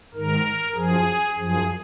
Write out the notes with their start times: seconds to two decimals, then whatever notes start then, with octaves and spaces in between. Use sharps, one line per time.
0.14 G#2 D#3 A#4
0.75 F#2 F3 G#4
1.36 F#2 F3 G#4